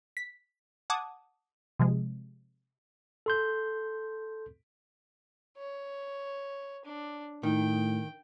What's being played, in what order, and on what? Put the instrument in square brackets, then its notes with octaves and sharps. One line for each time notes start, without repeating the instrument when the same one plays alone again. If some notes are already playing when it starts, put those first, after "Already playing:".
[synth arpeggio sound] B6
F#5 A5 D6 D#6 G#6
C3 F3 G#3
[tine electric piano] A4 C6 G6
[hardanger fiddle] C#5
D4
[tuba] A2 [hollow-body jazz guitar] D#3 [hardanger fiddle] G5